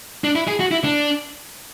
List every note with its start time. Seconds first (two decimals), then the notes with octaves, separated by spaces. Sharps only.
0.24 D4
0.35 E4
0.48 G#4
0.60 F#4
0.71 E4
0.84 D4